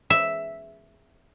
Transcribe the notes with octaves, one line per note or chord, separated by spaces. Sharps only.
E5